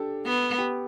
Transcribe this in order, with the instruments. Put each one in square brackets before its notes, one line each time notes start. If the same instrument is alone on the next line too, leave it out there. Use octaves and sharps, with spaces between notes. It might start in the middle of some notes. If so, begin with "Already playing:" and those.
Already playing: [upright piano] D4 G4 A4
[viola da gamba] B3
[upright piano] G4